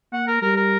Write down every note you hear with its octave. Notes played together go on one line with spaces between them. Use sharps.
A#3 F#5
A#4
G3 A#4
A#4